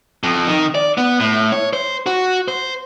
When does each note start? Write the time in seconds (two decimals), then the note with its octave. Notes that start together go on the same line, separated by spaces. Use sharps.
0.23 F2
0.47 D#3
0.75 D5
0.98 B3
1.20 A2
1.52 C#5
1.73 C5
2.06 F#4
2.48 C5